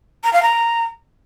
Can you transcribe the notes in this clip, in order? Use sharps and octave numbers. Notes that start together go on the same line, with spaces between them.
A#5
F5
A#5